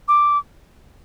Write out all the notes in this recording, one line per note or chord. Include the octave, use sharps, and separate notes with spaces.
D6